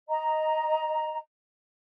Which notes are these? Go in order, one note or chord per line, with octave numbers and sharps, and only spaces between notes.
D#5 A#5